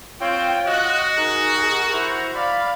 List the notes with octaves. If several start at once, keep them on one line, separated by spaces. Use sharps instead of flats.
C4 F4 C#5 G5
F#4 D#5 F#6
D#4 G#4 A#4
E4 C5 A#5
D5 F5 B5